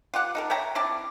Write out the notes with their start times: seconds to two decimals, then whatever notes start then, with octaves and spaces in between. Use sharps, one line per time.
0.14 F4 G4 F#5
0.35 D#4 A4 A#4
0.50 C#5 E5 G5 A#5
0.75 C4 E4 D5 A5